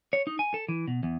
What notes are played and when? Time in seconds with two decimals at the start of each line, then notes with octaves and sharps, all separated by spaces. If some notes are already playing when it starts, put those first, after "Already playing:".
0.13 C#5
0.27 D#4
0.39 G#5
0.54 A4
0.69 E3
0.88 B2
1.03 E2